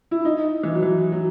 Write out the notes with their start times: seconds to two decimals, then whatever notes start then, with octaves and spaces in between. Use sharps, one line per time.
0.11 E4
0.25 D#4
0.63 E3
0.75 F#3
0.83 E3
1.12 F#3